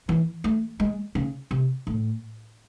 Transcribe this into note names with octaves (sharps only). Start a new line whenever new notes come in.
E3
A3
G#3
C#3
C3
A2